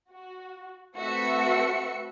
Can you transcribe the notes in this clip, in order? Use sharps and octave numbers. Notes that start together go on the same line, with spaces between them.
F#4
A3 C4 F#4 B4 E5 C#7